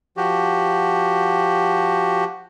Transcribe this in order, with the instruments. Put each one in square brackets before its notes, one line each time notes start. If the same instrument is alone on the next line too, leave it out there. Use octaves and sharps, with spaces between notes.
[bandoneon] F3 F#4 G4